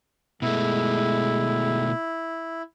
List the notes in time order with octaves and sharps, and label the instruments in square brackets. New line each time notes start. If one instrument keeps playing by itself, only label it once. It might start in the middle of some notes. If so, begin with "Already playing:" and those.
[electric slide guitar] B2 A3 [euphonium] G#3 [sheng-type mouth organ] E4